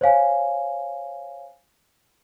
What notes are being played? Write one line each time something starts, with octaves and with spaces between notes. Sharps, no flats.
C5 C#5 F5 G#5